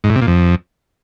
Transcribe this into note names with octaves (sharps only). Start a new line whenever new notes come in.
G#2
A2
C3
A#2
F2